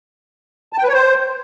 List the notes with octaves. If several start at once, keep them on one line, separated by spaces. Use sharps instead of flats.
A5
G5
B4
C#5
C5